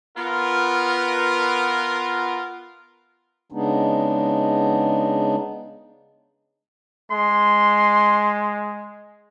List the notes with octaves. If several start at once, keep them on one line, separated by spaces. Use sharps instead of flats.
B3 F4 A#4
C#3 G#3 B3 D4 D#4
G#3 C6